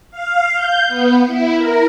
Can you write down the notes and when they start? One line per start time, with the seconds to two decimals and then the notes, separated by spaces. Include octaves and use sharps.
0.11 F5
0.55 G6
0.88 B3
1.27 E4
1.58 A#4